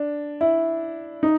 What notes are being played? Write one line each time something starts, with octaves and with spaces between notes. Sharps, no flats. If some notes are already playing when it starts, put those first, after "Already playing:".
Already playing: D4
E4
D#4